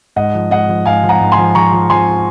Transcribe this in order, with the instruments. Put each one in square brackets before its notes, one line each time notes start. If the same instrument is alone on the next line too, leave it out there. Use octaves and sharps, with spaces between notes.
[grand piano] G#2 D#5 F#5
F3
G#2 D#5 F#5
F3
G#2 F5 G#5
F3
F#5 A#5
G#2
G#5 C6
F3
F3 A#5 C#6
F3
F3 G#5 C6